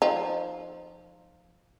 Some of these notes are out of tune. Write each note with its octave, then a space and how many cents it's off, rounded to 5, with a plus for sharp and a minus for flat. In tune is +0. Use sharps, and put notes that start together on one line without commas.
F3 +0 D#4 -20